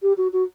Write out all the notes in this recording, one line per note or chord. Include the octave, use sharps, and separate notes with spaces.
G4
F#4
F#4